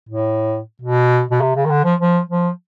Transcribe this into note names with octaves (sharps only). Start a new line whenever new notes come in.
A2
B2
B2
C3
C#3
D#3
D3
F3
F3
F3